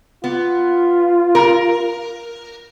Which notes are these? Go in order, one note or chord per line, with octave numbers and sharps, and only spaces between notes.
B3 F4
A#4